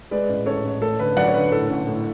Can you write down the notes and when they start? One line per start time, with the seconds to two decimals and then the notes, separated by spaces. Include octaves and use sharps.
0.11 G#3 B4 D5
0.29 A1
0.46 A1 A4 C#5
0.64 A1
0.81 A3 A4
0.99 D3 B4
1.16 F#3 D5 F#5
1.27 C#5
1.34 D3 B4
1.51 A2 A4
1.70 A1
1.87 A2